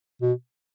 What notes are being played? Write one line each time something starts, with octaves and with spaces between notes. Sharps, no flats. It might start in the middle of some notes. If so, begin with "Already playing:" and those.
B2